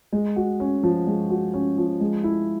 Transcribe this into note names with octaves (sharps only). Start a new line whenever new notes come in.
G#3
F#4
C#4
F3
G#3
F#4
C#4
F3
G#3
E4